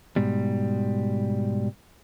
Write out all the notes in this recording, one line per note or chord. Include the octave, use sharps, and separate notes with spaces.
G#2 B2 G3